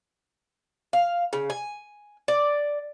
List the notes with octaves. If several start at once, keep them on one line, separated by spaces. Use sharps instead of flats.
F5
C#3
G#5
D5